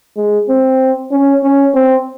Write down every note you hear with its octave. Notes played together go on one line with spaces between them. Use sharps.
G#3
C4
C#4
C#4
C4